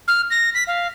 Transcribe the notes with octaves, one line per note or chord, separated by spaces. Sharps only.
F6
A#6
B6
F5